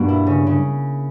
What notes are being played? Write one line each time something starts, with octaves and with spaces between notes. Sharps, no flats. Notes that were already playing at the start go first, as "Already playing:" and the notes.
Already playing: G2 B2 A#3 D4
E4
C#3
C#3